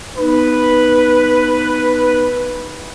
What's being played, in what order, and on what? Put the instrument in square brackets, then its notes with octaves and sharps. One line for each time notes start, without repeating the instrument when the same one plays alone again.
[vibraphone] B3 D#4 [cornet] B4